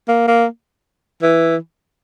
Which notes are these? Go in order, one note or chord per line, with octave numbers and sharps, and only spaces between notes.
A#3
A#3
E3